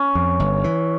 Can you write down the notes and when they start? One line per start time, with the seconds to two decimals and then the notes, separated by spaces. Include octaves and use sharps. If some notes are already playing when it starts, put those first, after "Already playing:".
Already playing: C#4
0.15 F2
0.40 G1
0.64 E3